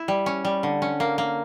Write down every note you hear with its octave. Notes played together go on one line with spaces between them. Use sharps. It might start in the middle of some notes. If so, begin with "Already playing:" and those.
Already playing: E4
G3
C#4
G3
D3
C#4
A#3
A#3